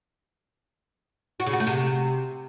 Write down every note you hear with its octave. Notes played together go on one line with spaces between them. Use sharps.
F#4
C#3
F#4
A3
C3